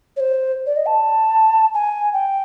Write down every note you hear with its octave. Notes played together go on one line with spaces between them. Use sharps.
C#5
C5
D5
D#5
A5
G#5
G5